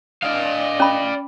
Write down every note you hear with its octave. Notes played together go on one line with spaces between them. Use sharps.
D4 D5 D#5 F5
C#4 B5